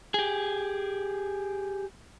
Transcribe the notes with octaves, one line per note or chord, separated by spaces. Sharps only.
G4 G#4